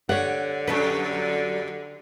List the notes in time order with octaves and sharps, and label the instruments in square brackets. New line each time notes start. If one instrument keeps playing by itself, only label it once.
[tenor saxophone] D3 [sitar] G4 [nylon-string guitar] C#5 F#5
[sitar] F2 G3 D4 [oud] F#3 A4 B4